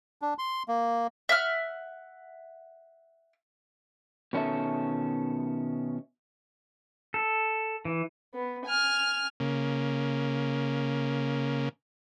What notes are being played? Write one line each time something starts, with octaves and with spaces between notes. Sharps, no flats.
D4
C6
A#3
E5 F#5 F6
B2 D#3 C#4 E4 A4 E5
A4
E3
B3
G#5 F6
C#3 A#3